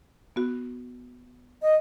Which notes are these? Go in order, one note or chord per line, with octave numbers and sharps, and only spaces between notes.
B3 F#4
D#5